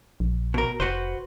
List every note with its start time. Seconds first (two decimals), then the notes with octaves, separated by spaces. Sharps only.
0.20 A#1
0.54 B2 A#4
0.80 F1 F#4 B4 C5